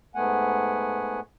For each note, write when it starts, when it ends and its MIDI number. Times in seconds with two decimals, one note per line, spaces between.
0.15 1.20 44
0.15 1.20 57
0.15 1.20 59
0.15 1.20 78
0.15 1.20 80